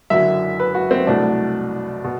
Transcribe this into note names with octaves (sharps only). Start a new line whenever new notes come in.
F#1 F#2 D3 F#3 E5
B4
F#4
C4
C2 B2 F#3 A3 D4
B2